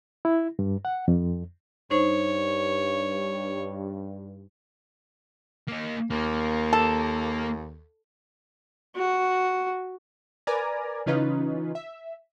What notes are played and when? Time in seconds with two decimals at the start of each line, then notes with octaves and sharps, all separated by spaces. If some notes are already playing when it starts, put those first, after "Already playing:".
0.25 E4
0.59 G2
0.85 F#5
1.08 F2
1.91 G2 D#4 C5 C#5 C#6
5.68 A#3 D#4
6.11 D#2 A#3
6.73 A4
8.95 F#4
10.47 A#4 B4 D5 G#5 A#5
11.06 C#3 E3 C#4 D#4 F4 B4
11.75 E5